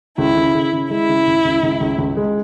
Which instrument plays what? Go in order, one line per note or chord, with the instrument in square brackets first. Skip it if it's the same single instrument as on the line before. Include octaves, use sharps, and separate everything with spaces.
[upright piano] C#2 [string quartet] E4
[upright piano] C#3
C#3
C#3
[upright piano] G#3 [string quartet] E4
[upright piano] C#3
C#2
C#2
C#2
C#2
C#2
G#3